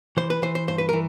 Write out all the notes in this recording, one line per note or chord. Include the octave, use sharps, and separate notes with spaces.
E3 C5
B4
E3 C5
C5
G2 C5
B4
E3 A#4